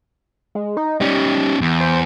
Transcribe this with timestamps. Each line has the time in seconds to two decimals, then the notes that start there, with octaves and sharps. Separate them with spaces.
0.55 G#3
0.77 D#4
1.01 G3 C#4 D#4
1.61 E2
1.80 C5